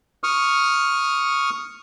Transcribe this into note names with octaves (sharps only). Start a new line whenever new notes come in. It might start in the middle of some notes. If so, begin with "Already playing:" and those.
C#6 D#6 F6